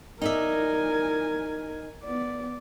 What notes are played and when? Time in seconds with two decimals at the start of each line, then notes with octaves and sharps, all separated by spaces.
0.22 D#4 A#4 D5 E5 G#5
2.04 B3 D5